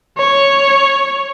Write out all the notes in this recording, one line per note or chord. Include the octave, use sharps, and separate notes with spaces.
C#5